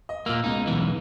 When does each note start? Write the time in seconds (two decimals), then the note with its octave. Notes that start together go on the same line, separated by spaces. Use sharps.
0.09 D#5
0.26 A#2 A#3 E6 F6
0.44 C#2 B2 D#4
0.67 B1 E2 E3